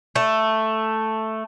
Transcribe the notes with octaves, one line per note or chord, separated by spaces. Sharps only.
A3